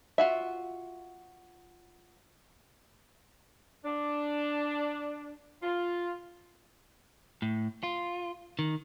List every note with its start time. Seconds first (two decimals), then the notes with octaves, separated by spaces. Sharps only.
0.18 F4 F#4 E5
3.84 D4
5.63 F4
7.42 A2
7.83 F4
8.59 D#3